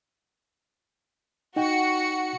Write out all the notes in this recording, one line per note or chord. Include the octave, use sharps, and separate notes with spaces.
D#4 F#4 G5 C#7